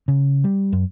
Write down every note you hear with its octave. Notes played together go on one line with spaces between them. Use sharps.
C#3
G3
F#2